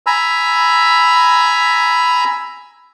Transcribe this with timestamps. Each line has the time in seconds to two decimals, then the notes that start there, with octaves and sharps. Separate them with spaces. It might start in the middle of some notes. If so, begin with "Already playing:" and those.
0.07 G#5 A#5 B5 E6